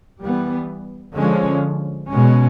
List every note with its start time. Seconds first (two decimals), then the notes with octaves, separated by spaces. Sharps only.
0.20 E3 G3 B3
1.15 D3 F3 G#3 C#4
2.11 B2 G#3 C#4